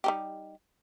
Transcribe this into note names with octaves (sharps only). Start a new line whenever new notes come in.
G3 D#4 G4